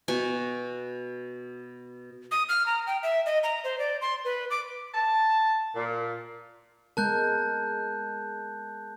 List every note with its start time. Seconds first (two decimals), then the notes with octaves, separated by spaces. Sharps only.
0.08 B2 F#4 G#5
2.32 D#6
2.49 F6
2.66 A#5
2.87 G5
3.03 E5
3.26 D#5
3.43 A#5
3.64 C5
3.79 D5
4.01 C6
4.25 B4
4.50 D6
4.94 A5
5.76 A#2
6.97 G#3 B3 A#4 A5 F#6 G6